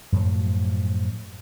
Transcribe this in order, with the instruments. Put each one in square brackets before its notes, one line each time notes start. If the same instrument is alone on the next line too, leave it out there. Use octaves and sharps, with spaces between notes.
[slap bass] F#2 A2 F3 F#3